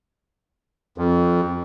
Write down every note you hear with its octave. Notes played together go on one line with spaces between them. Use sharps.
F2